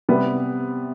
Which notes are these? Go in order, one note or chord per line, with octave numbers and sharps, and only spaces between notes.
C3 G3 B3